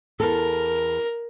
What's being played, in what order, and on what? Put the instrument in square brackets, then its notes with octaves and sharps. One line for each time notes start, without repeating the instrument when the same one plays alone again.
[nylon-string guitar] E2 A4 [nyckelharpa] A#4